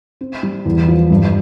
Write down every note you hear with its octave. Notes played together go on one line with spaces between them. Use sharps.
C4
G3
E2
F3
G2